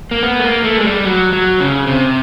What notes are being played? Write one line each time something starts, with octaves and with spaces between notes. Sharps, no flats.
A#3
B3
A3
A#3
A3
G#3
G3
F#3
F#3
C#3
C3